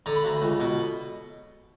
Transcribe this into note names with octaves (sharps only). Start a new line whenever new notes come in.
D3 A#5
B5
D2 A#5
C#2
B2